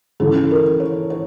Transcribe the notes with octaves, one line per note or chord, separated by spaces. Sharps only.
C#3 E3 A4
A#4
C#5
C#5